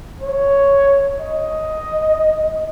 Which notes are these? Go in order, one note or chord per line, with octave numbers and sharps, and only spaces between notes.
C#5
D#5